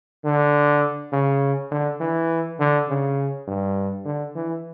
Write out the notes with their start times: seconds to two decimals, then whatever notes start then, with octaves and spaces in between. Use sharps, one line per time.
0.25 D3
1.12 C#3
1.71 D3
2.01 E3
2.59 D3
2.89 C#3
3.47 G2
4.05 D3
4.35 E3